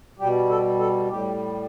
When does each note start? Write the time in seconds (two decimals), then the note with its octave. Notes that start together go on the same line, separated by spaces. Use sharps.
0.19 B2 G3 G4
0.49 A4
0.79 A4
1.09 A2 G3 G4